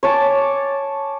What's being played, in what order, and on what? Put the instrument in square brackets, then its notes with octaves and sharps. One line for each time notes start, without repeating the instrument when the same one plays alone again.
[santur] C#5 G#5 A5 D6